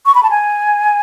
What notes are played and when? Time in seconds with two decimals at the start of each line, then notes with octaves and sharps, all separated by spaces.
0.06 C#6
0.15 B5
0.23 A5
0.30 G#5